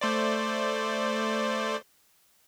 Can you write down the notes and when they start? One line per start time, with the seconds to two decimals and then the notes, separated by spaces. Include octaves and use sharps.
0.01 A3 C5 D5